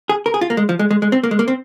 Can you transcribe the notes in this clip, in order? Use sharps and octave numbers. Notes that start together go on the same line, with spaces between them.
G#4
A#4
G#4
F4
A#3
G#3
F3
G#3
G#3
G#3
C4
A#3
G#3
A#3
C4